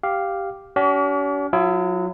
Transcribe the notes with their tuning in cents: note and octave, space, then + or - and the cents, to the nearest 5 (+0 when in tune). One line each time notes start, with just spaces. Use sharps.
G4 +0 F5 +0
C#4 +45 G4 -45
F#3 -25 E4 +40